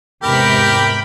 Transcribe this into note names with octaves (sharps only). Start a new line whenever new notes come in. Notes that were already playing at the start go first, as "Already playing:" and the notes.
E2 G#2 C3 G4 A#4 G5 B5